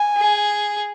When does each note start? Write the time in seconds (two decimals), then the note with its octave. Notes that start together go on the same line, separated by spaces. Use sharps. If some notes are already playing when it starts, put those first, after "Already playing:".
Already playing: G#5
0.17 G#4